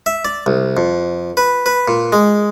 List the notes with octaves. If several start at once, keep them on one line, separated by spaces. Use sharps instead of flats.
E5
D5
C2
F2
B4
B4
A#2
G#3